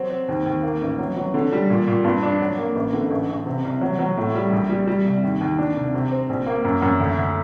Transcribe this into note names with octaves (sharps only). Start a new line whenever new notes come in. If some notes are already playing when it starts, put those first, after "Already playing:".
Already playing: F#3 C4
C4
D#2
D#2
A#3
A1
F#3
F#3
D3
G3
A#2
A#2
G2
D4
F#3
A#3
A1
D3
A1
A1
C3
C2
F#3
F#3
A2
G3
A#1
G3
G3
C2
D#2
D#2
D4
C2
C3
C4
A#1
A#3
F#2
F#2
D2
D2